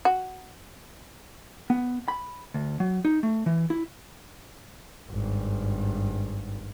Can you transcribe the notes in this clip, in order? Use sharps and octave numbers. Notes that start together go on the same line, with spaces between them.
F#4
B3
B5
D2
F#3
D#4
A3
E3
E4
G#1 G2